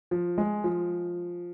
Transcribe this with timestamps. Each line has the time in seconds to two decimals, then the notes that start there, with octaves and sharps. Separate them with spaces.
0.11 F3
0.38 G#3
0.64 F3